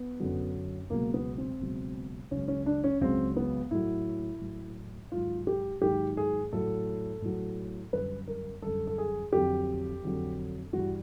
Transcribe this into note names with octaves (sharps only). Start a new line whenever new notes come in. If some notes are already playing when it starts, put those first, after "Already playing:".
Already playing: B3
F#2 D3 F#3
C#2 B2 F#3 A#3
B3
C4
C#2 B2 F#3
C#2 C#3 F#3 C#4
C#4
D4
C#4
C#2 C#3 F#3 C4
B3
A2 F#3 E4
A2 F#3
G#2 D#3 F#3 F4
G4
G#2 D#3 F#3 G4
G#4
A2 F#3 A4
A2 F#3
F#2 D3 G3 B4
A#4
F#2 D3 G3 A4
A4
G#4
F2 D3 F#3 G4
F2 D3 F#3
G2 E3 G3 F#4